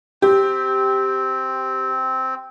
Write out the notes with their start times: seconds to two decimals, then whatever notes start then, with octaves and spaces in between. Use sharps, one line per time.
0.22 C4 G4